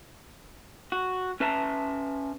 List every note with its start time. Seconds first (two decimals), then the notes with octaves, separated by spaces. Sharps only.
0.92 F#4
1.40 C#4 B4 E5 A5 A#5